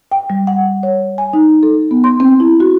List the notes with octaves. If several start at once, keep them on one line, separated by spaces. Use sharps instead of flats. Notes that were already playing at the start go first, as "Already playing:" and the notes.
G5
G3
F#5
C#5
G#5
D#4
A4
B3
C6
C4
E4
F#4